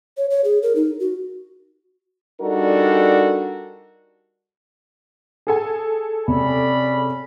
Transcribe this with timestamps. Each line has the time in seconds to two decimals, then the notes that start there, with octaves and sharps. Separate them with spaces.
0.17 C#5
0.30 C#5
0.44 G#4
0.63 A#4
0.75 D#4
1.00 F#4
2.41 G3 D4 D#4 F#4 A4 A#4
5.47 G#4 A4 G#5
6.28 C3 C#4 D5 B5